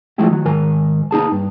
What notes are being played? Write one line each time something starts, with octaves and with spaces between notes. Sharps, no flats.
F3 G#3 A3 E4 G4
D#3 F#3
G#2 D#3 A#4 G#5
A#3 D#4 G#4 A5
G2